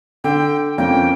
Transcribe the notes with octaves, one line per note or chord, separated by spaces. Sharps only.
D3 G5
F2 A#3 C#4 G5